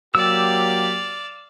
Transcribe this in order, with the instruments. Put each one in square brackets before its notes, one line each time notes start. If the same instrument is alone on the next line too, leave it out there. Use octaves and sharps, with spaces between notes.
[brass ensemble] F#3 A#3 G4 [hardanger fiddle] D5 F5 [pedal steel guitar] E6